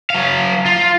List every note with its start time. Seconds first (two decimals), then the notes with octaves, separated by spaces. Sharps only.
0.10 F#3 F5
0.66 F4